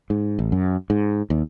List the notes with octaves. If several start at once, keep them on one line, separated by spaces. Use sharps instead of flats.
G#2
A1
F#2
G#2
D#2